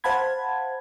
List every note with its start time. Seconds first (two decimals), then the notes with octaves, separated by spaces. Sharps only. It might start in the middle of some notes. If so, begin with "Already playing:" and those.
0.04 C5 F5 F#5 A5 B5 G#6